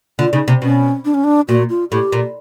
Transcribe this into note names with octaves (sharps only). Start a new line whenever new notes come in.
D3 F4
C#3 D#4
C3
B2 C#4
D4
C#4
D4
A#2 F#4
F4
A2 G4
A#2